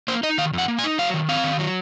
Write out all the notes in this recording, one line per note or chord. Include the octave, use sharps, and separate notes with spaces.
A#3 C5
D#4 D#5
D#3 F5
F2 F#5
A#3
G#5
D#4
F#3 F5
D#3
C4 F5
D#3
F#3